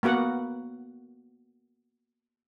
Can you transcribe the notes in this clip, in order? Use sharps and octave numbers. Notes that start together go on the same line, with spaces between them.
A#3 B3 F#4 F#5